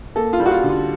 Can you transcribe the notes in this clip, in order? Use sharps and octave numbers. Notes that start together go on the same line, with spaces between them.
A#3 A4
F4
G3
F#4
F4
D3
F4